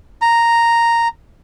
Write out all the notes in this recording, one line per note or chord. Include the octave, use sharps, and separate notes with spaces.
A#5